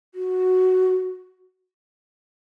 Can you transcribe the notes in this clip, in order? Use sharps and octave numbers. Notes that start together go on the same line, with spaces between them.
F#4